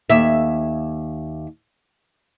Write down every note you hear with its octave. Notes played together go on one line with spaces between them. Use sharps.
D#2 E5